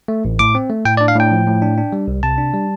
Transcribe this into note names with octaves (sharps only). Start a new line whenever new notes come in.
A3
A1
A2 D6
C4
A3
A2 G5
D5
D4
F5
A2 G5
F3
A2
D4
D4
G3
C2
C3 A5
D4
G3